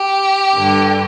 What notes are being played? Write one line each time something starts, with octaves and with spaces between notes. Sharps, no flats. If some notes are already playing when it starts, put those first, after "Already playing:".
Already playing: G4
G2 D3